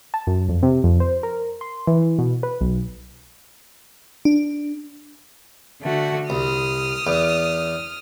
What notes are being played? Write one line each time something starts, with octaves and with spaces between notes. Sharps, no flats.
A5
F#2
F2
C3
F2
C5
A#4
C6
E3
B2
B4
B1
D4
D3 A3 F#4
C2 D#6 F6
E2